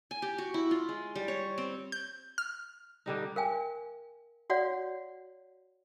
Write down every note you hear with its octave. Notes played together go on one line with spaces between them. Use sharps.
G#5
G4
F#4
E4
F4
G#3
G3
C#5
C4
G6
F6
D3 G3 D#4
A#4 F5 G5 G#5
F#4 C#5 D5 F5 F#5